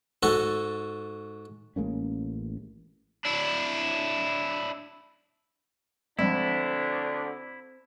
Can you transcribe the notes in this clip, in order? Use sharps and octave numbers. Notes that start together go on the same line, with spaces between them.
G#2 F#4 A4
A1 G#3 A#3 C#4
D4 E4
D2 D3 F3 G3 G#3 C4 D4 E4